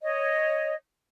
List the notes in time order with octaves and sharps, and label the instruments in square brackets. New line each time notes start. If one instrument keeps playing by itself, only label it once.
[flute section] C#5 D#5